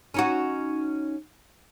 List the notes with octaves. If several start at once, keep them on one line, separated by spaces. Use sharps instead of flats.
C#4 D#4 F#4